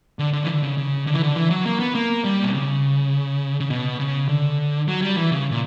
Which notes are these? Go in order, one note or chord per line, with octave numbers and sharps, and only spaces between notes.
D3
D3
E3
D3
C#3
C#3
D3
E3
D3
E3
F#3
A#3
B3
A#3
G3
B2
C#3
C#3
B2
C#3
D3
F#3
G3
E3
C#3
A#2